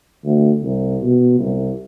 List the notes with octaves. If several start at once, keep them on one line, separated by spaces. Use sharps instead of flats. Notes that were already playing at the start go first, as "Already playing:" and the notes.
D2
C2
B2
C2